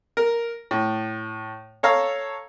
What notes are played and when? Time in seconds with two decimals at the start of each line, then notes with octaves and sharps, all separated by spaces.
0.17 A#4
0.71 A2
1.83 A4 C#5 F5 A#5 E6